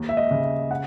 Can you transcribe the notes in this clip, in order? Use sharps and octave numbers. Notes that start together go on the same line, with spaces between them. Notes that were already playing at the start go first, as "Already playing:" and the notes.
Already playing: D#2
E5
D#5
C#3
E5
F#5